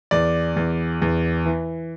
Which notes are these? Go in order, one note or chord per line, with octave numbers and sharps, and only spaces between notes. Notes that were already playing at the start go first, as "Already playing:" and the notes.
E2 D5
E2
E2
E3